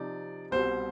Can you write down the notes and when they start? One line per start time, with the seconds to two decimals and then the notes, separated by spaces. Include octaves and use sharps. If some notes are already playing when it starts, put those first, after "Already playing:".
Already playing: C3 F3 C4 D#4 D5
0.51 C2 B2 G3 C4 C5